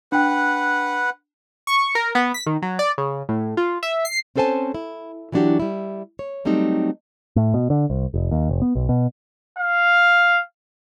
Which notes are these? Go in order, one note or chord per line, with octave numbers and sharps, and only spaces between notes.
D4 B4 F#5 G5
C#6
A#4
B3
B6
D#3
F#3
D5
C#3
A2
F4
E5
C7
C4 C#4 A4 C5 G#5 A5
E4
E3 F#3 B3 D4 F#4 G4
G3 E4
C#5
F#3 G3 A3 C4 D#4
A2
B2
D3
C2
F1
D#2
F1
B3
B1
B2
F5